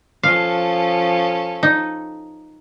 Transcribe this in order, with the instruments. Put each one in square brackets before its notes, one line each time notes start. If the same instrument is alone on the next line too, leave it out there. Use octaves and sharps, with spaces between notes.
[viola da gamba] F3 C#4 A4 [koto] F5
[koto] D#4